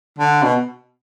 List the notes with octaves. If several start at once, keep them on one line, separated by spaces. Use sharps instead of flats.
D3
B2